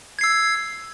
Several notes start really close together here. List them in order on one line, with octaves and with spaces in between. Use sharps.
G#6 C7 E6